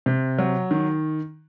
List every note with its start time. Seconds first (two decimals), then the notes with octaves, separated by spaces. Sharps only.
0.06 C3
0.39 F#3
0.71 D#3